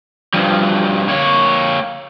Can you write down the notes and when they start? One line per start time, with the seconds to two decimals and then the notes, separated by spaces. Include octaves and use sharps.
0.34 G2 F3
1.08 A#3 C#5